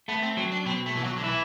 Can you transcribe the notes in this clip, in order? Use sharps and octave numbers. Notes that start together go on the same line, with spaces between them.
A3 B3
C4
F#3 C4
D4
B2 C4
A3
B1 E3
F#3
D3
E3 E4